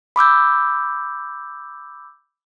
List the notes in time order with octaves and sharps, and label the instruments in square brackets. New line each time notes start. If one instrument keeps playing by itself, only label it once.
[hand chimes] B5 D6 E6 G6